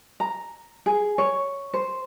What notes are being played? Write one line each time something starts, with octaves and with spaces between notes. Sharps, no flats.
A#5
G#4
C#5
C5